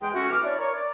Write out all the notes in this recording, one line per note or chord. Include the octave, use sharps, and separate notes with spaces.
E2 G#3 G5
A3 C#4 F#4
B2 E3 D6 F6
D4 E4 C#5 D5
A#4 C#5
D5